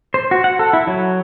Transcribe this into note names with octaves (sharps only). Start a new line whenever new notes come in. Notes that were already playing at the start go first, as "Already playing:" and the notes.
C5
F#4
F#5
A4
E4
F#3